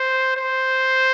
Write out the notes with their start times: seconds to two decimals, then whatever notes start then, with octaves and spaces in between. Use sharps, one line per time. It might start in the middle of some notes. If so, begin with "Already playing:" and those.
Already playing: C5
0.37 C5